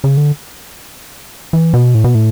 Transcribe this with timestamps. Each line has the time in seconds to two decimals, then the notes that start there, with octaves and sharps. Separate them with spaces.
0.04 C#3
0.17 D3
1.53 E3
1.74 B2
1.94 A2
2.04 B2
2.15 A2